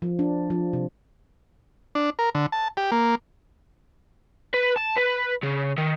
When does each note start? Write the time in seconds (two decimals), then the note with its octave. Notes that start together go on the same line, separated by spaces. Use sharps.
0.02 F3
0.19 D4
0.50 F3
0.73 C3
1.95 D4
2.19 A#4
2.35 D3
2.52 A5
2.77 G4
2.92 A#3
4.54 B4
4.76 A5
4.97 B4
5.43 C#3
5.78 D#3